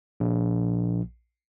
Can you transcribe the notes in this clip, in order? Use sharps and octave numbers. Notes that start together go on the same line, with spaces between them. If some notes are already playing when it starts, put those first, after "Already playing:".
A#1